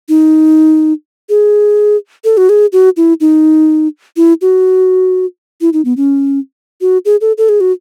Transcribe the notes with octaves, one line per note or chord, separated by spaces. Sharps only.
D#4
G#4
A4
F#4
G#4
F#4
E4
D#4
E4
F#4
E4
D#4
B3
C#4
F#4
G#4
A4
A4
G#4
F#4